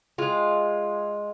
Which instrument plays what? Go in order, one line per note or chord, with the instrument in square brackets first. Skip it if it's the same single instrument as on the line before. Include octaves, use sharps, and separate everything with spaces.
[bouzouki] G#3 F4